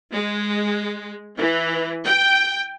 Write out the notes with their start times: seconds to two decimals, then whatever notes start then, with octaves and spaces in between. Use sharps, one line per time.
0.13 G#3
1.39 E3
2.05 G5